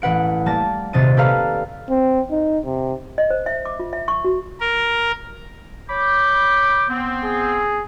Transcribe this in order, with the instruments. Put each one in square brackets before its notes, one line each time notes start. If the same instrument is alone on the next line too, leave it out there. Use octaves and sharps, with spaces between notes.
[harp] A1 B4 F#5 D7
G3 A#3 A5 A#6
D#1 C3 C5 D#5 A6 D#7
G4 A4 B4 D5 F5 A#5
[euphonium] C4
D#4
C3
[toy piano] D#5
C5
E5
D6
F4
E5
C#6
F#4
[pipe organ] A#4
[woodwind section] C#5 B5 D6 [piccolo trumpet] G6
[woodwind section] B3 C4
[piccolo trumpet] G#4